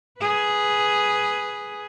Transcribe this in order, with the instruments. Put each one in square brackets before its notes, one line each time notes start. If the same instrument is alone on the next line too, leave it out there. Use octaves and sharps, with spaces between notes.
[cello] G#4 B4